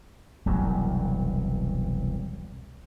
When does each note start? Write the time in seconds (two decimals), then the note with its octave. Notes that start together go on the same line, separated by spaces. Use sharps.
0.46 E1 C2 F#2 F#3